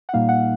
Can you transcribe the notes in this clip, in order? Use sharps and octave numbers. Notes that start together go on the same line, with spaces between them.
F#5
A#2 G3 A#3 D#4 F5
F#5